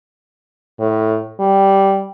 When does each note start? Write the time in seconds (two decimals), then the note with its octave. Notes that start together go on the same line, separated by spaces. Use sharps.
0.80 A2
1.40 G3